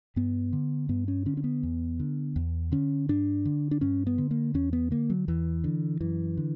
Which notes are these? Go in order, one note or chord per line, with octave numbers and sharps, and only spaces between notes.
G2 B3
D3
G2 B3
C#4
D3 C#4
C#4
B3
E2
D3
E2
D3 C#4
G2 D4
D3
D4
G2 C#4
B3
D3
A#3
E2 C#4
B3
D3 A#3
F#3
E2 E3
D3
F#2 E3
D3